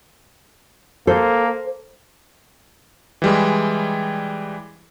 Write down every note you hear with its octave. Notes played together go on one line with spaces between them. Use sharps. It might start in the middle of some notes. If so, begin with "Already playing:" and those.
A#3 A4 C5
E3 G3 G#3